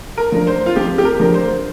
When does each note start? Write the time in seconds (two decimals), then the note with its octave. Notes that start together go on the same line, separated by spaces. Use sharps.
0.18 A#4
0.32 F3 D4 A#4
0.47 C5
0.66 F4
0.76 F2 G4
0.98 G4
1.05 A#4
1.19 F3 D4 A#4
1.34 C5